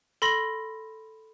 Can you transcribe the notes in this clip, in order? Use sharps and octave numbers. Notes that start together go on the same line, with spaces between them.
A4 B5 C6 A#6 F#7